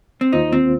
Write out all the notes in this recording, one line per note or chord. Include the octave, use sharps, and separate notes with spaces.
C4
D#2 D#3 A#3 D#4 F4 C5
C4